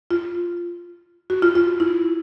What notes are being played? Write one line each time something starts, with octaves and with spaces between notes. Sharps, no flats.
F4
F#4
F4
F4
E4